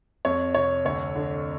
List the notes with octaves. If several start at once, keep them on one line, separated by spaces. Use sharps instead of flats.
F2 C#5
C3 C#5
D2 C#5
D3